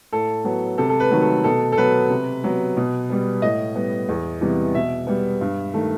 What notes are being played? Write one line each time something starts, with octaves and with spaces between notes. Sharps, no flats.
A2 A4
F#3 B3
C3 A4
A4
B4
D#3 F#3 A3
A4
B2 A4
A4
F#3 B3 B4
C3
F#3 B3
B2
G3 B3
A2 D#5
G3 B3
E2
C3 E3 G3 B3
B2 E5
G3 B3
G2
D#3 A3